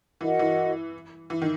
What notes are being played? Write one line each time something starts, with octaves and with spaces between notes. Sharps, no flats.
E3 F#4 A#4 D#5 F#5
E3
E3
D#3